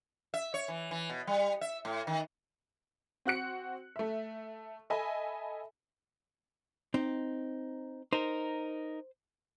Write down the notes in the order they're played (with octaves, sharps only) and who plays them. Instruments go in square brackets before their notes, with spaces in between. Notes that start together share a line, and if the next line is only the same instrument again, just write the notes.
[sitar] E5
C#5
E3
E3
B2
G3
E5
A2
D#3
[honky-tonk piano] C4 F#4 F#6 C#7
A3 E5
A4 D#5 E5 G#5 B5
[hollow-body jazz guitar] C4 D#4
[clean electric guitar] D#4 A#4 [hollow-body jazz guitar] C5